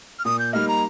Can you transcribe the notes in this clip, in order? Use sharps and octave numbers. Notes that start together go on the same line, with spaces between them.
F6
A#2 D#6
G6
G3 A#3 D#4 F6
A#5